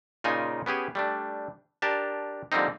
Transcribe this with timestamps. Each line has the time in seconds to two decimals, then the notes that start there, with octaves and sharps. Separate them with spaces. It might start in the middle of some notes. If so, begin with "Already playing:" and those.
0.24 A#2 C#3 D#4 F4 G#5
0.66 B3 C#4 G4 G#4
0.95 G3 A3 D4
1.82 D4 G4 A#4 A5
2.52 D3 F3 G3 A#3 C4 D#4